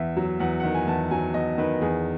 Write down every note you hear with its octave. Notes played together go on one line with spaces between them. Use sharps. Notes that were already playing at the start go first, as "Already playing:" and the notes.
Already playing: E2 E5
F#3
E2 F#5
D#3 F#5
G#5
E2 A5
F#3 G#5
E2 D#5
D#3 B4
E2 G#4